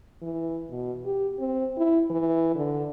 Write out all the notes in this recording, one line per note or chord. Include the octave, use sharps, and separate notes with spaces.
E3
B2
G4
C4
E4
E3
D3